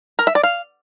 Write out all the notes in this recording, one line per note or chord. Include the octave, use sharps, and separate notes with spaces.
A#4
E5
D5
F5